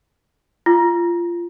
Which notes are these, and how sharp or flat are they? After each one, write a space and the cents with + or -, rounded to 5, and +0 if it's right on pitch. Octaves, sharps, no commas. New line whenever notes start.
F4 -20